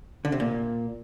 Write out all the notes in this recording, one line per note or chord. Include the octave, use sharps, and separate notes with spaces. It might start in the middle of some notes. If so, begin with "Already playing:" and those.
D3
C3
A#2